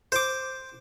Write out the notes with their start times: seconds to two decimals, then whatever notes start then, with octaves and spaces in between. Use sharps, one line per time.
0.12 C5 D6